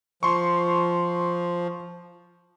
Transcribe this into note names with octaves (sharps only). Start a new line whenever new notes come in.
F3 C6 C#6